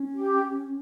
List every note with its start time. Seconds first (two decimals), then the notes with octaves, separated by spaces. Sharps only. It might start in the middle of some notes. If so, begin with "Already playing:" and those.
Already playing: C#4
0.15 G4